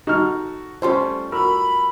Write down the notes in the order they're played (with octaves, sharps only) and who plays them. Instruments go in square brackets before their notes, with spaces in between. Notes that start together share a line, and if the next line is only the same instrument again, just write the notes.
[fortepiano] D#4 F6 [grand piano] F#4 A4
[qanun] G3 A3 F4 [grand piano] C#4 A4 [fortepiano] C5 C6
[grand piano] F#4 A#4 E6 [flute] B5